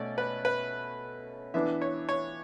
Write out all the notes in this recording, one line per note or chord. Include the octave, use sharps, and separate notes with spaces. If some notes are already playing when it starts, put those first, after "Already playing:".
Already playing: B2 A3 C#4 D5
B4
B4
E3 B3 D4 E5
C#5
C#5